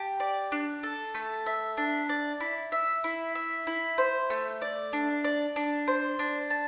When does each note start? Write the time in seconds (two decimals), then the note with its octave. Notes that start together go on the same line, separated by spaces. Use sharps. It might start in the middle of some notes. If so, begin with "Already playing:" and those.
Already playing: G4 A5
0.20 D5
0.52 D4
0.83 A4
1.15 A3
1.46 E5
1.77 D4
2.09 D5
2.40 E4
2.72 E5
3.04 E4
3.35 E5
3.67 E4
3.98 C5
4.30 A3
4.62 D5
4.93 D4
5.24 D5
5.56 D4
5.88 C5
6.19 D4
6.51 A5